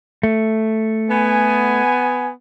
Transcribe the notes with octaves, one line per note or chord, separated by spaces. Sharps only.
A3
B3 G#5